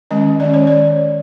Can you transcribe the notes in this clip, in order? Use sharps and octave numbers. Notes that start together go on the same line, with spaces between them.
D#3 G#3 C#4 D#5
D#3 G#3 C#4 D5
C#5
D5